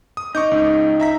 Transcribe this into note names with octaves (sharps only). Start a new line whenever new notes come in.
D#6
D#4 C#6 D6 G6
C#2
E5 A#5 B6